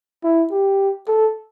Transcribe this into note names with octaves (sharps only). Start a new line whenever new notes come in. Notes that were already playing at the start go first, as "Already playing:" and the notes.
E4
G4
A4